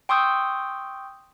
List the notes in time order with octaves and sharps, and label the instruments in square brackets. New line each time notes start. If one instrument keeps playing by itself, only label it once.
[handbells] G5 C6 C#6 D#6 E6 G6